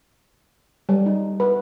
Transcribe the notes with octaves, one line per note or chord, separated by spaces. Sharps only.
G3
D#4
B4